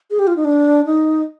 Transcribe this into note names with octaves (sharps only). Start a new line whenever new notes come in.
G#4
G4
F4
D#4
D4
D#4